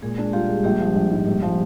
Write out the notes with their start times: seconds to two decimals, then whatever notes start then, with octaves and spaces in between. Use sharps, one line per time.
0.02 A#2 G#3 G#4
0.18 D4
0.33 G3 F4 G4
0.49 G#3
0.64 A#1 G3 G4
0.80 F3
0.96 A#1
1.11 G#2
1.27 A#1
1.42 F3